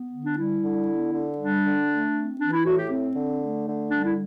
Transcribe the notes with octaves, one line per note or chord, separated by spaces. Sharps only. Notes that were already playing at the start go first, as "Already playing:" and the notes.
Already playing: B3
D3
D4
G3 E4
D3
B3
D3
G3 D4
D3
A3
C4
E3 D4
E4
A2 F#4
G4
C4
D3
A3
D3
G3 D4
E4